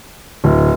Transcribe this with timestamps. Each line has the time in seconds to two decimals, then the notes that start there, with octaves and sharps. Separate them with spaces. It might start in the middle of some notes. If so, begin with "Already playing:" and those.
0.44 D1